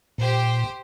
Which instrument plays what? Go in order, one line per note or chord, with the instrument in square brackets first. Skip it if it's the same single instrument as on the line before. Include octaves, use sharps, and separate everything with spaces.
[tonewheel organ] A#2 [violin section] G4 C5